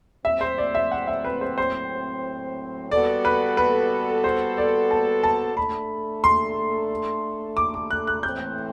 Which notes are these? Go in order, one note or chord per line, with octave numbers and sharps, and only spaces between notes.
A2 F#3 C4 E5
C5
D5
E5
F#5
E5
B4
C5
C5
G3 B3 F#4 A4 D5
B4
B4
C5
D5
A5
A5
A3 D4 A4 B5
C6
D6
D6
F#6
F#6
A2 E3 A3 C4 G6